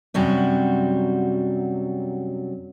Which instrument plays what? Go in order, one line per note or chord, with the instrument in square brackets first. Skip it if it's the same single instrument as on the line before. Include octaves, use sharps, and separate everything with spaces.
[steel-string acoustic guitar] F#2 C3 F#3 G3 F#4